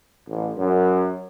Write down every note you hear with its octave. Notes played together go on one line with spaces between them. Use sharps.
A1
F#2